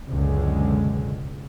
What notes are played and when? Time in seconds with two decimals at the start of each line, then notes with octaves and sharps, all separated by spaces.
0.10 C#2 F#2 B2 D3 G#3